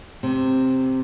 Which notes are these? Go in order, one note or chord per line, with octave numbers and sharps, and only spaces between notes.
C3